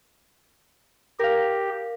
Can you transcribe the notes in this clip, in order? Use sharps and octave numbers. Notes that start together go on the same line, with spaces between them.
G4 A#4 F5